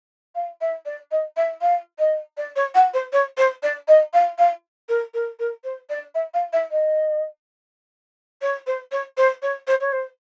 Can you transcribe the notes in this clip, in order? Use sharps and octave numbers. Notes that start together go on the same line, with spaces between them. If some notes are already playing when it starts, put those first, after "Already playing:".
F5
E5
D5
D#5
E5
F5
D#5
D5
C#5
F#5
C5
C#5
C5
D5
D#5
F5
F5
A#4
A#4
A#4
C5
D5
E5
F5
E5
D#5
C#5
C5
C#5
C5
C#5
C5
C#5
C5